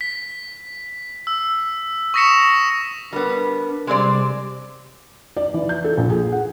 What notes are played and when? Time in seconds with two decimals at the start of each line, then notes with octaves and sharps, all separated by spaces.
0.01 B6
1.27 E6
2.14 C#6 D#6 A#6 B6 C#7 E7
3.13 G3 B3 D4 A#4
3.87 C3 G3 G#3 C4 G4 D5
5.37 D5
5.54 E3
5.69 G6
5.84 A4
5.97 A#1
6.09 G#4
6.32 F#5